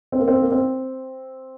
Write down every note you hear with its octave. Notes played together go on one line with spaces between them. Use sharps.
C4
A#3
C4
A#3
C4